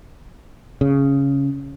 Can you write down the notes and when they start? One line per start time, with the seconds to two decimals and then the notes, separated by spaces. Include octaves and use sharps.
0.81 C#3